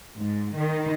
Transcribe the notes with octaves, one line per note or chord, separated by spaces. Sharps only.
G#2
D#3